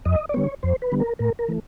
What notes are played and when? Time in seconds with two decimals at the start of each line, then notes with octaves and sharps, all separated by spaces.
0.05 F2 D#5
0.29 D5
0.34 D3 G3 B3 C#5
0.63 F2 C5
0.82 B4
0.92 D3 G3 B3
1.00 A#4
1.19 A2 A#4
1.39 A#4
1.48 E3 A3